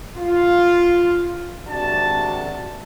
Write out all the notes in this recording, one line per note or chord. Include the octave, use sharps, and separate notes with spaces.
F4
G#1 C3 D4 F#4 A5